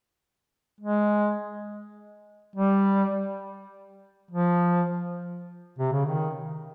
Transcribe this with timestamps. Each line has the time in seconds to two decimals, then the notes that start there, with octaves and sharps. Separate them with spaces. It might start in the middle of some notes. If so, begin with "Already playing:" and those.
0.81 G#3
2.56 G3
4.31 F3
5.79 C3
5.92 C#3
6.05 D#3